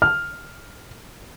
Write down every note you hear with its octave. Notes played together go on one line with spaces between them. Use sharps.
F6